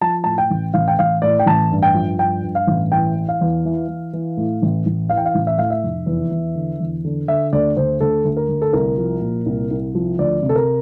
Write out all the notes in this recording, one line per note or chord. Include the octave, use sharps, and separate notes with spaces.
F3 A5
A2 A5
G5
A1
A1 F5
G5
A1 F5
A2 D5
G5
A1 A5
G2
G5
F3
G2 G5
G2
F5
A1
E3 G5
E3
F5
E2
E3
E3
E3
A2
A1
A1
E3 F5
G5
F5
A1
E5
A2 F5
E5
F1
E2
E2
D3
E2
D3
D3 E5
D2 D5
D2 C5
D2 A4
D2
A#4
D2
A4
C2 A#4
F3
A#2
C2
C2
F3
D2 D5
C3
A4
A#4